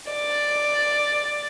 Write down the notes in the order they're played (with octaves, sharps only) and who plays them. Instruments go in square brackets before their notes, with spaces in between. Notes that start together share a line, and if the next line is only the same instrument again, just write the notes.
[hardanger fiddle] D5